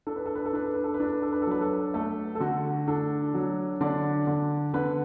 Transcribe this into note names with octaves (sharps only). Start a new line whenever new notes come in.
D4 A4
B4
A4
B4
A4
D4 B4
A4
B4
A4
B4
D4 A4
B4
A4
B4
A4
F#3 B4
A4
A3 A4
A4
D3 F#4
D4 A4
F#3
D3 D4 D5
D3
D3 B3 B4